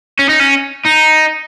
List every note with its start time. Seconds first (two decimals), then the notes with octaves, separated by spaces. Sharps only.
0.19 C#4
0.29 D#4
0.40 C#4
0.86 D#4